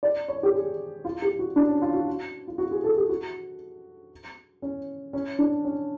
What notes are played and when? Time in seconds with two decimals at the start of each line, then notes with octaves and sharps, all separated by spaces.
0.03 D5
0.28 C#5
0.43 G4
0.54 G#4
1.05 F4
1.22 G4
1.39 F#4
1.56 D4
1.69 C#4
1.82 F4
1.94 F#4
2.48 F4
2.58 F#4
2.71 G#4
2.84 A4
2.96 G4
3.09 F#4
4.62 C#4
5.13 C#4
5.39 D4
5.65 C#4